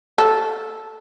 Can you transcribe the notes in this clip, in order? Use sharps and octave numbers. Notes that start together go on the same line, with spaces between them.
A4